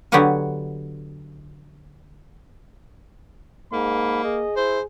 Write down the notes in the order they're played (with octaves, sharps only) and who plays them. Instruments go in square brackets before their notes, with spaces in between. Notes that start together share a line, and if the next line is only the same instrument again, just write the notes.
[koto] D3 F#3 B3 G4 F#5 G#5
[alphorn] G#2 [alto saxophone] A#3 [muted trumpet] B5
[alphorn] G#4 [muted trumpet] D#5
[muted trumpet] E4 [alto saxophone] C5